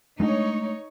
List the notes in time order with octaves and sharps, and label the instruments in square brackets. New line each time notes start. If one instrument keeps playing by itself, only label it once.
[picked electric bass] G#3 A3 D4 [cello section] D#4 C#5